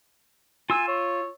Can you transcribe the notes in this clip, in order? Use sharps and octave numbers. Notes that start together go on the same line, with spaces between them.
F4 G#5 E6
C#5